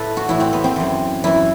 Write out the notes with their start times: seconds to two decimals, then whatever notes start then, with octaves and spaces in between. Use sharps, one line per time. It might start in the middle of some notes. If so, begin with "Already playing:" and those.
Already playing: A2 E4 A4 B4
0.17 F#4
0.28 A2 E3 E4
0.40 C4
0.53 B3
0.64 C4
0.76 F#2 E3
1.24 F#2 E3 E4